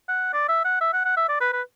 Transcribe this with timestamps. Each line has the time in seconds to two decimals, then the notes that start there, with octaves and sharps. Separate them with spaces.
0.09 F#5
0.33 D5
0.48 E5
0.65 F#5
0.81 E5
0.93 F#5
1.05 F#5
1.17 E5
1.29 D5
1.41 B4
1.53 B4